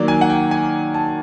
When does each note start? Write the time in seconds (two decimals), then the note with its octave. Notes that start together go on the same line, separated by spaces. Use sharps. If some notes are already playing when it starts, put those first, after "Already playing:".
Already playing: D#3 F#3 A#3 D5
0.08 G#5
0.21 F#5
0.30 G5
0.51 G#5
0.94 A5